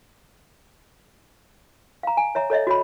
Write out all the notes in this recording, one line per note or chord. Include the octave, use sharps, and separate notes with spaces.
F5 A#5
G#5
C#5 E5 A#5
A4 C#5 D#5 E5
F#4 C#5 B5